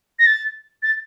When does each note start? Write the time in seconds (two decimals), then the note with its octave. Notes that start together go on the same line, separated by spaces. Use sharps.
0.19 A#6
0.26 A6
0.83 A6